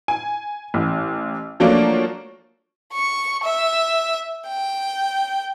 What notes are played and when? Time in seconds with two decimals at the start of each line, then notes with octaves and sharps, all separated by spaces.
0.08 G#5
0.74 A1
1.60 F3 F#3 A3 A#3 D4 F4
2.93 C#6
3.43 E5
4.48 G5